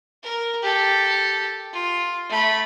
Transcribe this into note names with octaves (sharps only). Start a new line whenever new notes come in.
A#4
G4 A4
F4
A3 B5